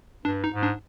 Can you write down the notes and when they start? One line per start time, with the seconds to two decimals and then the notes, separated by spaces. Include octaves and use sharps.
0.25 G2 D4
0.44 D#4
0.52 G#2
0.63 D4